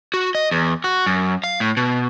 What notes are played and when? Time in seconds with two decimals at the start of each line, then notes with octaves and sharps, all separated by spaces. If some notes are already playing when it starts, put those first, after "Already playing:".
0.14 F#4
0.35 D#5
0.51 E2
0.84 F#4
1.06 F#2
1.44 F5
1.60 A2
1.77 B2